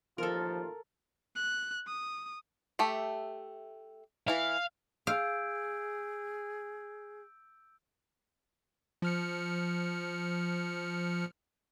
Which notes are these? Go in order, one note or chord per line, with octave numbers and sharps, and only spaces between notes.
A1 D#2 F3 F4 A4 A#4
F#6
D#6
A3 G4 E5
E3 E4 F5
G#4 F5 E6 G6 D7
F3 F6 C#7